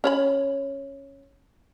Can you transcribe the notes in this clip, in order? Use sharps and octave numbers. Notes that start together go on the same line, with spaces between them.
C#4 C#5 B5